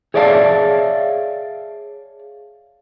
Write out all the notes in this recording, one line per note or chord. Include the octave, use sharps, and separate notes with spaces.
G#4 C#5 D5 E5 F5 A5